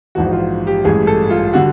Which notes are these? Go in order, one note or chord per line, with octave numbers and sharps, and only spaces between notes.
A#1 G#2 E3 F#4
F4
G4
A1 G2 E3 G#3 G#4
A4
F4
D3 G3 F#4